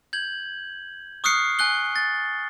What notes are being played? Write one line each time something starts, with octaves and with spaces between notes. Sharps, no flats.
G6 G#6 F#7
C#6 D#6 F6 F#6 C7 C#7
G#5 F#6 G7
A6